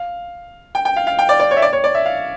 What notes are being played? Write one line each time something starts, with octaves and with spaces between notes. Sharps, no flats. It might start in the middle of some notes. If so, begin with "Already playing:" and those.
Already playing: F5
G5
G5
F5
F5
G5
D5
D5
C#5
E5
D5
C#5
D5
E5
F5